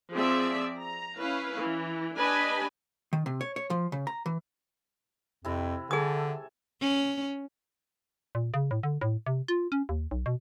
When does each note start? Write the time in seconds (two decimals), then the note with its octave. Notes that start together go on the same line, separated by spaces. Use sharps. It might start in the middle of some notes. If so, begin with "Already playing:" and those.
0.14 F3 C4 G#4 D5 E5
0.78 A#5
1.18 C#4 E4 B4 F5
1.59 E3
2.18 D4 G4 B4 D#5 G#5 B5
3.13 D#3
3.26 C3
3.41 C#5
3.56 C#5
3.70 F3
3.92 C#3
4.07 A#5
4.26 E3
5.45 F2 C3 E4
5.91 D3 G#4 A4 G#5 D#6
6.81 C#4
8.35 A#2
8.54 C#3
8.71 A2
8.83 D3
9.01 A2
9.26 C3
9.48 F4
9.72 C#4
9.89 D#2
10.11 B1
10.26 B2